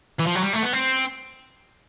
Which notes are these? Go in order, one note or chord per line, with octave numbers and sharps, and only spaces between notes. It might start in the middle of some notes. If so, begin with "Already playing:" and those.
E3
F3
F#3
G3
A3
B3
C4